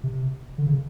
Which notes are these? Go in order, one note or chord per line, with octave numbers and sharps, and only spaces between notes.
C3
D3
C#3